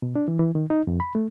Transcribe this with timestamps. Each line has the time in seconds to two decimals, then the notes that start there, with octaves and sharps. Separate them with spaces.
0.02 B2
0.16 D4
0.28 E3
0.39 E3
0.55 D#3
0.70 D#4
0.87 F2
1.00 B5
1.15 A3